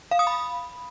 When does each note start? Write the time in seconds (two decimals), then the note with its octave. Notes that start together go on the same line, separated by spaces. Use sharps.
0.11 F5
0.19 D#6
0.27 B5